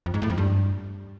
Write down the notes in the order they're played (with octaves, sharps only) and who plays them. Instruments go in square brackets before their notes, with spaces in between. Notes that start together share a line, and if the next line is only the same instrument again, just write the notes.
[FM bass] F2
G#2
A2
F2
G2